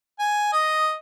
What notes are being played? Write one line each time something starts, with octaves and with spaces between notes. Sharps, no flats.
G#5
D#5